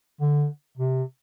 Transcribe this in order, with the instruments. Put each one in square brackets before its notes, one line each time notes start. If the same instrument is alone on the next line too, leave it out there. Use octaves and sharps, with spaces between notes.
[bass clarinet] D3
C3